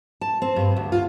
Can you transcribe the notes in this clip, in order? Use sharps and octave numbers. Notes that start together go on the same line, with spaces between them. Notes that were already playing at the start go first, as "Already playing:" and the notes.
A5
C4
G2
D2
F4